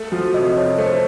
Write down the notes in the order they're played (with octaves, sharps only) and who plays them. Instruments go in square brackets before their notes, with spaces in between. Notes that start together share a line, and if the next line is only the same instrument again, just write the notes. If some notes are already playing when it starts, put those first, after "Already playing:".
Already playing: [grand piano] A3
[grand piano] F3 [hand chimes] F#4
[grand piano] C3 [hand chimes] D#5
[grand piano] F2 [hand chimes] C#5
[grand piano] A3 [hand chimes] C5